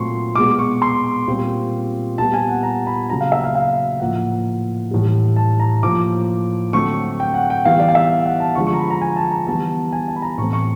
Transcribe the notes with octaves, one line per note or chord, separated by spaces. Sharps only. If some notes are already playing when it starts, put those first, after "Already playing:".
Already playing: A#2 F#3 A3 C4 C6 C#6
B2 G#3 B3 D6
C#6
C6
A#2 G3 C4
A#2 G3 B3 A5
G#5
F#5
A#5
B5
C#3 F#3 A#3 A#5
F5
E5
F5
F5
A2 F3 A#3 F#5
A2 E3 G3
A5
A#5
A2 F3 A#3 D6
D3 F#3 A3 C4 C#6
G5
F#5
G5
E3 G3 B3 F5
D5
F5
E5
F#5
A5
D3 F3 G#3 C#6
C#6
A#5
B5
A#5
G#5
A5
A#5
E3 G3 B3 A5
G#5
A5
B5
A#5
A2 E3 A3 C4 C#6
C#6